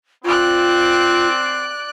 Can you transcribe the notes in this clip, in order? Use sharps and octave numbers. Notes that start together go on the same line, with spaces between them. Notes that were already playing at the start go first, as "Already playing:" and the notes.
C4 F4 D5 F#6